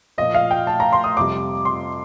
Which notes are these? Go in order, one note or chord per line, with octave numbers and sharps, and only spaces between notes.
A#2 F3 D#5
F5
G5
A5
A#5
C6
D#6
F2 C3 G3 D6
C6